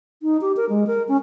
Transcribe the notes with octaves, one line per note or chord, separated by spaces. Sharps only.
D#4
G4
A#4
G#3
A#4
C#4